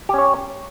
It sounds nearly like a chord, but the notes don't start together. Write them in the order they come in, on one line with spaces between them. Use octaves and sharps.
G4 C#4 C#5